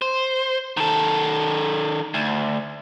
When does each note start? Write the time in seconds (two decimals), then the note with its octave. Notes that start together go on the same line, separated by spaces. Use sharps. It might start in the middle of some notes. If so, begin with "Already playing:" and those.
0.02 C5
0.77 D#3 A4
2.14 D2